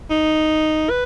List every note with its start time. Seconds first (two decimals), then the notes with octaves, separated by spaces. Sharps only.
0.10 D#4
0.90 B4